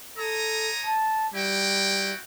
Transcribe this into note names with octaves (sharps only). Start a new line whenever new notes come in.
A4 C#5 A#5 D#6
A5
G3 E4 F#4 G5